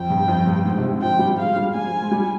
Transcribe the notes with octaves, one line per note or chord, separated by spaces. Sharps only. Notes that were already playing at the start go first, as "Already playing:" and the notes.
Already playing: F2 G5
G2
F2
G2
G#2
C3
D3
F3 G5
G3
G#3 F5
G3
G3 G#5
F3
G#3
G3